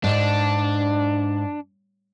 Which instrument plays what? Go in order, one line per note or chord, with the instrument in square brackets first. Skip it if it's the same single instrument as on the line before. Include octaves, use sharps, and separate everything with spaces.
[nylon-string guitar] G#2 [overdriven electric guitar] D4